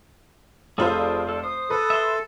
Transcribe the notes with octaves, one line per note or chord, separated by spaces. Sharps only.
F1 F4 G#4 A4 C5 C#5 B5
D5
A4
C5 D#6
A4 B4
E5 C6